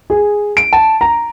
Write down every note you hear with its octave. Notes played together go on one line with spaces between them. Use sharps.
G#4
D7
A5
A#5